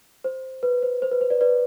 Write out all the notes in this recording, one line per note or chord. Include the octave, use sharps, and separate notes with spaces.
C5
B4
C5
C5
B4
C5
B4 D5
B4 D5